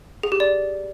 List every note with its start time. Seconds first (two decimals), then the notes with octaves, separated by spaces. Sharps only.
0.23 G#4
0.32 G4
0.40 D5